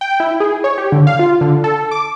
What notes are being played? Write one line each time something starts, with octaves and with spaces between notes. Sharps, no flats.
G5
E4
G#4
C#5
G4
D3
F5
F4
D3
A4
D6